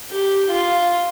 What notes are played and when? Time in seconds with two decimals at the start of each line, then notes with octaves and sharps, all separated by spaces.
0.11 G4
0.51 F4